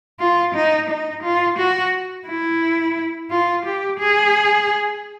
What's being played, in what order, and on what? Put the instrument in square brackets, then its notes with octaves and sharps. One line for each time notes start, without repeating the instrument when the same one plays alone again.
[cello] F4
D#4
D#4
F4
F#4
E4
F4
G4
G#4